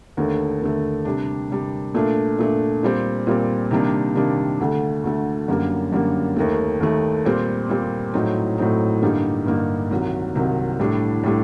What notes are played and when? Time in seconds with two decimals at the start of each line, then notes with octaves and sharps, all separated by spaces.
0.17 D#2 D3 A3
0.61 D#2 D3 A3
1.05 C3 G3 D4
1.50 C3 G3 D4
1.94 A#2 A3 D4
2.38 A#2 A3 D4
2.83 A#2 G3 C4
3.27 A#2 G3 C4
3.71 C3 D#3 G3 A#3 D4
4.15 C3 D#3 G3 A#3 D4
4.60 D2 D3 A3
5.04 D2 D3 A3
5.48 F#2 D3 G3 A#3
5.92 F#2 D3 G3 A#3
6.36 D#2 D#3 A3
6.81 D#2 D#3 A3
7.25 A#2 G3 C4
7.69 A#2 G3 C4
8.14 A2 F#3 C4 D#4
8.58 A2 F#3 C4 D#4
9.02 G2 D3 G3 A#3 D#4
9.46 G2 D3 G3 A#3 D#4
9.91 C2 C3 D#3 F#3
10.35 C2 C3 D#3 F#3
10.79 A2 G3 D4
11.23 A2 G3 D4